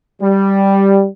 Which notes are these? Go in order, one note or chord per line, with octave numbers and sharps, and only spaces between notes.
G3